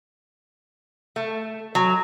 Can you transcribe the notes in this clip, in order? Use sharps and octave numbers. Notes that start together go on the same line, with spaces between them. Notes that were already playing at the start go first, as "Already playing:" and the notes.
A3
F#3